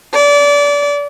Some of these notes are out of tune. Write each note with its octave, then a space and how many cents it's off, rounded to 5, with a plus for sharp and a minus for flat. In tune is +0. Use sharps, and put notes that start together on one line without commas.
D5 -30